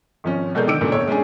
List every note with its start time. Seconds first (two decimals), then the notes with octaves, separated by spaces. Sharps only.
0.24 G#1 F3 C#4
0.55 B2 G#3 A4 A#4 D5 G6
0.67 D3 D#3 D6 E6 D7
0.81 G2 A#2 C#3 A3 D4
0.92 E1 C#5
1.07 G#3 C#4 D4 G#4